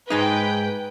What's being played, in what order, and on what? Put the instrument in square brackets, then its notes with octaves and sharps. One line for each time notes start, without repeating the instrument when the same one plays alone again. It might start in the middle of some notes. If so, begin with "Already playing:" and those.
[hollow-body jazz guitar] G#2 G#3 D#4 [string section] B4 G5